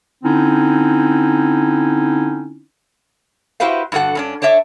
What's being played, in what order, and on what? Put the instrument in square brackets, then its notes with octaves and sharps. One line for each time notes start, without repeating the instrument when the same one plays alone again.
[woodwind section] D3 C4 C#4 D#4 E4
[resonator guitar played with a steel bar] E4 F#4 G4 B4 C5 F5
G2 D3 F#4 A4 F#5
G2 C#4 D4
D4 C#5 D5 E5